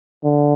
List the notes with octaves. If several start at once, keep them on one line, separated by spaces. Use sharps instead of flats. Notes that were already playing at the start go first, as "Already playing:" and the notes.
D3